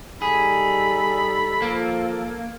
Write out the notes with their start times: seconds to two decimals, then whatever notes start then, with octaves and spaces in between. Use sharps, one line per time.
0.22 G3 D#4 G#4 A4 B5
1.62 F3 A#3